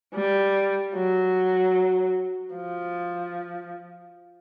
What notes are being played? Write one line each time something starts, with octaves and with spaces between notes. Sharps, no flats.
G3
F#3
F3